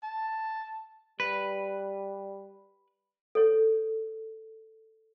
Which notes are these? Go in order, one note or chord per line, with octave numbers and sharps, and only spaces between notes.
A5
G3 B4
A4 C#5